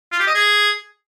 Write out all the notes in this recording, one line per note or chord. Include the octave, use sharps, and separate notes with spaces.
F4
G4
D#5
G#4